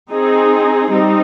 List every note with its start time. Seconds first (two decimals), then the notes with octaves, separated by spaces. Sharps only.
0.11 C4 D#4 G#4
0.92 G3 C4 D#4